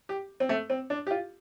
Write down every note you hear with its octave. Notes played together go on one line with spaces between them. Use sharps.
G4
C4
A3
C4
D4
G4
F4